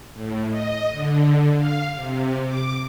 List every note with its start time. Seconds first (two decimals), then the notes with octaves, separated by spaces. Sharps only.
0.14 A2
0.50 D#5
0.91 D3
1.58 F5
1.95 C3
2.46 D6